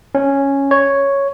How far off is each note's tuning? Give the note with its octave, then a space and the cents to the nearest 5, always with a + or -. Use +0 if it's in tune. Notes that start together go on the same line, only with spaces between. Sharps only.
C#4 -5
C#5 +0